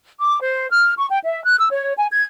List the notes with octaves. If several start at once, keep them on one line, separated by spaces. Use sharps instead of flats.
D6
C5
F6
C#6
G5
E5
F#6
E6
C#5
G#5
G#6